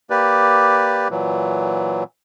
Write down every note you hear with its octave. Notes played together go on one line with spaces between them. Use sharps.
A#3 G4 B4 D5
A#2 E3 F#3